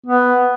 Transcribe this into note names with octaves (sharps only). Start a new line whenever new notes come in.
B3